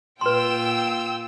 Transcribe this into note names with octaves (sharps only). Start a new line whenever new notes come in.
A#2 F4 B4 G5 C6 E6